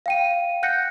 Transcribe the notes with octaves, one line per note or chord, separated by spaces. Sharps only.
F5 G5 D#7
F#5 F#6 G6 A#6 C#7